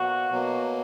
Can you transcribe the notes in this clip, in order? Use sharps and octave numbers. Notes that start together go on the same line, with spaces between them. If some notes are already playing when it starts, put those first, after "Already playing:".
Already playing: B2 F#3 A#3 F#4
B2 F#3 A#3